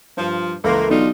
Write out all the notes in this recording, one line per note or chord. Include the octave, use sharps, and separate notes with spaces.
G2 F3
C#2 E3 A3 A#3 C6
B1 D4 D#4 F4